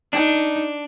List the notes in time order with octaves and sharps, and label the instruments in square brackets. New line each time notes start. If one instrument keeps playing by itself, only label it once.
[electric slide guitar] D4 [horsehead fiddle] D#4